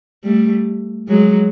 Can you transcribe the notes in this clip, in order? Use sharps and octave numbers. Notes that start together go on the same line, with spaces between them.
G3 A3
F#3 G#3